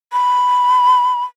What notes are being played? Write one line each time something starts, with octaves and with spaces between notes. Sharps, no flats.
B5